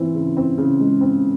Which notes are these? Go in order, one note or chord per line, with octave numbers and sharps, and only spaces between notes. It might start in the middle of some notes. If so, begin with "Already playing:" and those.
Already playing: E3 C4
C#3
C4
C#3
G#3
C4